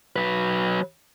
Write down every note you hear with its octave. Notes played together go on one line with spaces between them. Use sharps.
F#3 B4